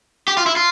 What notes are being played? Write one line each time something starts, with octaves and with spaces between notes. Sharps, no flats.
G4
F4
E4
F4